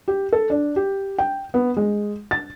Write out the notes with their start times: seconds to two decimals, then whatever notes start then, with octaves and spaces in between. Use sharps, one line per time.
0.08 G4
0.33 A4
0.50 D4
0.76 G4
1.19 G5
1.54 B3
1.77 G#3
2.31 A6